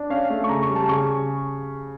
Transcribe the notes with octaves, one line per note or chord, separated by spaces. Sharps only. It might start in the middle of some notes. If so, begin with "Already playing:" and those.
Already playing: D4
C#4 F5
A3
C#6
C#3 A#5
C#6
G3
A5
C#3 C#6